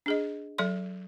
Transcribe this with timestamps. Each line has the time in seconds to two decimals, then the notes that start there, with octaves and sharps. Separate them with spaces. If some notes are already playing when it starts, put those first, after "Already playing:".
0.06 D4 G#4 D#5
0.58 F#3 A4 D5 C6